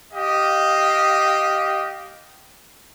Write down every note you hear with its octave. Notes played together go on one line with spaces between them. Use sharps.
G4 D#5 F5